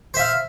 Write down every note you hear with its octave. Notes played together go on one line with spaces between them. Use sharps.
C5 E5 F5